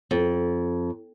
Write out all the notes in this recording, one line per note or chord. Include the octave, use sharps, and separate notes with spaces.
F2